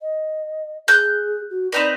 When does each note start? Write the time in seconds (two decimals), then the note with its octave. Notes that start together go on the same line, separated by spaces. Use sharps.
0.01 D#5
0.88 G#4 F#6 G6
1.50 F#4
1.72 C4 D#4 B4 D5